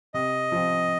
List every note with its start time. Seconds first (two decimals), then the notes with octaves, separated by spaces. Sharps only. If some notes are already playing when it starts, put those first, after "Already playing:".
0.14 C3 D#5
0.52 F3 C4